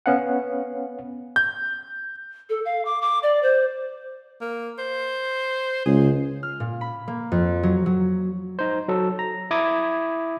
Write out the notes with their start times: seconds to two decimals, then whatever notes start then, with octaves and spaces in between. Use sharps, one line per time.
0.06 B3 C#4 F5 F#5
1.36 G6
2.49 A4
2.65 F5
2.85 D6
3.01 D6
3.23 D5
3.42 C5
4.41 A#3
4.78 C5
5.86 C#2 G#4
6.43 F6
6.60 A#2
6.81 B5
7.08 A#3
7.32 F2
7.63 F#3
7.86 F#3
8.59 D#4 C5
8.88 F#3 A4
9.19 A#5
9.51 E4 D6 D#6 G#6